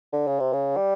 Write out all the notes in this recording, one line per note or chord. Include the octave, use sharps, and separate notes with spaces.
D3
C#3
C3
C#3
G3